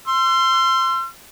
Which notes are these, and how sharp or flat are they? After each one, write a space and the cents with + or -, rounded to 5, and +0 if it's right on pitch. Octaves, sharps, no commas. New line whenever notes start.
C6 +0 E6 +45